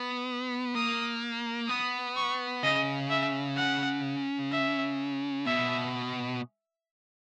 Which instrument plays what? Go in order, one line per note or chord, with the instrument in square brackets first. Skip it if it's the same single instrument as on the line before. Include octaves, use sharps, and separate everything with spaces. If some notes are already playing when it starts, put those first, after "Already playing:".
Already playing: [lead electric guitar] B3
[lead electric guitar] A#3 [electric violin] D#6
[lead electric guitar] B3 [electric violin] D#6
[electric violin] C#6
[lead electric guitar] C#3 [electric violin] D#5
[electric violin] E5
F#5
E5
[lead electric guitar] B2 [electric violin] E5